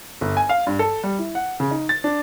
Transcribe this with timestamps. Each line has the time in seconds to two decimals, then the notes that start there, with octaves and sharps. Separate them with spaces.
0.21 G1
0.37 G#5
0.49 F5
0.67 G2
0.79 A4
1.04 G3
1.19 E4
1.35 F#5
1.60 C#3
1.71 D#4
1.89 A6
2.04 D4